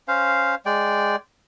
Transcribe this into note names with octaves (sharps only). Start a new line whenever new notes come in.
C#4 C5 F5
G#3 D5 G5